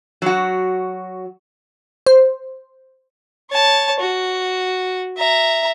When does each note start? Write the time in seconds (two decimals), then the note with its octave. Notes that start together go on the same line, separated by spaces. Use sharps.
0.22 F#3 F#4
2.06 C5
3.51 C#5 A5
4.00 F#4
5.18 E5 A#5